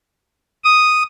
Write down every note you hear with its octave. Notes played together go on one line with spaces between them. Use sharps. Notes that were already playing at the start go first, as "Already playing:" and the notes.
D#6